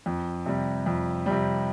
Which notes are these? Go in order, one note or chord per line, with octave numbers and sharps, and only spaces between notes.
F2
C3 G3
F2
C3 G3